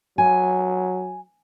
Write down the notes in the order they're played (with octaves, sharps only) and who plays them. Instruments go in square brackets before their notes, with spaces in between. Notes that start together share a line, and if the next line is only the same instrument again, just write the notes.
[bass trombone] F#3 [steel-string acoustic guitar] G#5